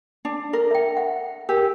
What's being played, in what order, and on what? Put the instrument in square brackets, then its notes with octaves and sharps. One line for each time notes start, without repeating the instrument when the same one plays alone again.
[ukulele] D4
A#4
[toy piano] E5 G5
F#5
[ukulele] G4 [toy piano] A#4